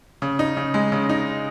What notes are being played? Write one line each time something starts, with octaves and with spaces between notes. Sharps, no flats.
C#3
D#4
C#3
G#3
C#3
D#4